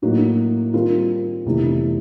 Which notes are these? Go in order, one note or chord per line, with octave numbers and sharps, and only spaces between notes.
A2 F#3 A#3 D#4 F#4
D#3 G3 C4 F4 A#4
F1 E2 C3 D#3